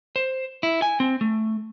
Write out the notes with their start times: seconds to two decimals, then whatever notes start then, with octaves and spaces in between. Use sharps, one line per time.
0.16 C5
0.63 E4
0.82 G#5
1.00 C4
1.21 A3